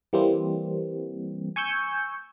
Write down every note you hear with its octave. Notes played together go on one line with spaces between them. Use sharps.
E3 G3 A#3 C4
G#5 C#6 E6 G6